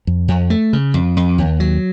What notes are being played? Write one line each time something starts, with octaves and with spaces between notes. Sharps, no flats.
F2
F2
A3
C#3
F2
F2
D#2
F#3